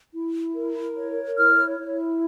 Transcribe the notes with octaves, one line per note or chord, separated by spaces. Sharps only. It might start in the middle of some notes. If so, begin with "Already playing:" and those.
E4
A#4
C#5
E4 F6
E4